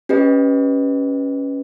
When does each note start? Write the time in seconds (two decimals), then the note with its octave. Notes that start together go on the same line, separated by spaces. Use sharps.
0.09 C#4 G4 B4 D#5